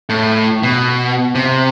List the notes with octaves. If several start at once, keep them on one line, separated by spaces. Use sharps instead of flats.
A2
B2
C3